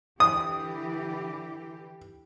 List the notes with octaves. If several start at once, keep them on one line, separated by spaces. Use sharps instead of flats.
D3 E3 G4 D#6